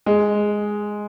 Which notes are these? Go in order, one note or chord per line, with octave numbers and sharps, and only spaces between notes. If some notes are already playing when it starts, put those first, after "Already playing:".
G#3